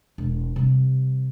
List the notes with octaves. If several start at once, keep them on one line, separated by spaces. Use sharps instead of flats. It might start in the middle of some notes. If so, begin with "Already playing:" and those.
E1
C3 G3